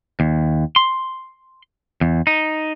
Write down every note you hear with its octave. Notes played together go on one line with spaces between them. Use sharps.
D#2
C6
E2
D#4